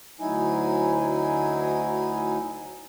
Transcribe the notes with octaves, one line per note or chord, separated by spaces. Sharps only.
D2 F#3 D#4 E4 G#5